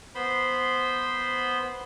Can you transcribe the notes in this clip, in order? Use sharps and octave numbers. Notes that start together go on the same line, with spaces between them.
B3 C5 B5 C6